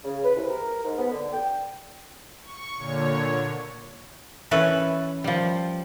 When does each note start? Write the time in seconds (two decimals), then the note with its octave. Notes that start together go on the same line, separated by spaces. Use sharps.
0.04 C#3
0.24 B4
0.35 C2
0.49 A#4
0.84 G#2
0.97 B3
1.11 D3
1.32 G5
2.42 C#6
2.77 A#2 D3 C#5
4.51 E3 C#4 A4 B4 E5
5.24 F3 G3